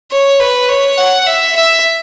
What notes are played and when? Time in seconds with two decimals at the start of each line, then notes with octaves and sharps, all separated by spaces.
0.11 C#5
0.40 B4
0.69 C#5
0.98 F#5
1.27 E5
1.56 E5